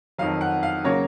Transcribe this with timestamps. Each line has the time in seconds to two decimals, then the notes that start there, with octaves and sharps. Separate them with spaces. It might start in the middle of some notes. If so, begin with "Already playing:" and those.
0.18 F2 D#3 F#3 F5
0.41 F#5
0.63 F5
0.84 C#3 F#3 A#3 C#5